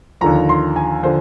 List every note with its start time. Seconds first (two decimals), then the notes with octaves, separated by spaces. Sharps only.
0.21 D#2 D3 F3 A#5
0.49 C6
0.76 G#5
1.03 D3 F3 C5